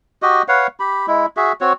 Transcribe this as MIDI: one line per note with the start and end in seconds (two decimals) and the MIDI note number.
0.22 0.42 66
0.22 0.42 67
0.22 0.42 75
0.48 0.67 71
0.48 0.67 73
0.48 0.67 77
0.48 0.67 78
0.80 1.06 67
0.80 1.06 83
1.07 1.26 56
1.07 1.26 64
1.37 1.52 66
1.37 1.52 68
1.37 1.52 76
1.61 1.73 60
1.61 1.73 66
1.61 1.73 73